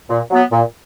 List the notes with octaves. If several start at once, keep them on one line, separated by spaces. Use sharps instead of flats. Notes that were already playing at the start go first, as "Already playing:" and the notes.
A#2
F#3 B3
A#2